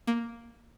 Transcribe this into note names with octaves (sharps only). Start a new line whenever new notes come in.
A#3